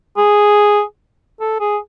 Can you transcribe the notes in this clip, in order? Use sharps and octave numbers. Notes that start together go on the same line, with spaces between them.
G#4
A4
G#4